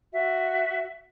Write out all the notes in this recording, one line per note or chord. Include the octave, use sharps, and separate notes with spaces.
F#4 E5